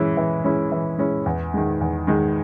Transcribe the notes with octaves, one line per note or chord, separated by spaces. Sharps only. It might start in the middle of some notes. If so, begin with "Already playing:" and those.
Already playing: E3 G#3 C#4 E4
E3
G#3 C#4 E4
E3
G#3 C#4 E4
E2
D#3 G#3
E2
D#3 G#3